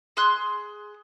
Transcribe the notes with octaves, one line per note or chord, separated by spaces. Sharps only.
G#4 C6 F#6